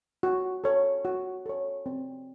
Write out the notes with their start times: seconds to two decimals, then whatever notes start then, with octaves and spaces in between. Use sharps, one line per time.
0.23 F#4
0.64 A4 C#5
1.05 F#4
1.46 A4 C#5
1.86 C4